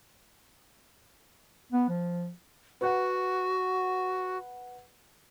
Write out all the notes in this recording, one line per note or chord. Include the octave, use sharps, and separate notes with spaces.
B3
F3
F#4 B4 F#5